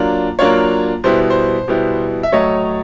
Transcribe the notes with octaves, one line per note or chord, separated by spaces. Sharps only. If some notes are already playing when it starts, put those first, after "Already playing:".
Already playing: F#3 A#3 D4 F4
F#3 A#3 D4 F4 C#5
B2 G3 B3 E4 C5
C5
B2 G3 B3 E4
E5
A2 F#3 A3 C#5 D#5